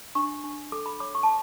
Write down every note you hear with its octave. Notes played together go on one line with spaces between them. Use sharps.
D4 C#6
D4
A4 D6
B5
C#5 D6
C#6
A5